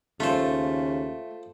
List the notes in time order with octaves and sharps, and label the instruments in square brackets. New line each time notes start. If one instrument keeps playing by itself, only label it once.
[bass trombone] D#2 [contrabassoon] C#3 [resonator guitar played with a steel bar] A3 [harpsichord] F4 C5